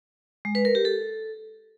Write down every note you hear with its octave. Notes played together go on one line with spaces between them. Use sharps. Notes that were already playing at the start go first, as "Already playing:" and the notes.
G#3
B4
A#4
G4
A4